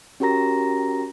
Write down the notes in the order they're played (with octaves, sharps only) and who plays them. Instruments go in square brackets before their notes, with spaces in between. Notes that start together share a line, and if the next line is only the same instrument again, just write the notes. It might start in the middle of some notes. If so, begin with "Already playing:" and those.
[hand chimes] C#4 F#4 G4 A#4 A#5 A#6